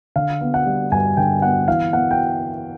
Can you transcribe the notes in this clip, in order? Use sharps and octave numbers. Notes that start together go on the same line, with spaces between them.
D3 F5
B3
F#5
G3
G2 G#5
D3 G5
B3 F#5
E3 F5
B3 F#5
G5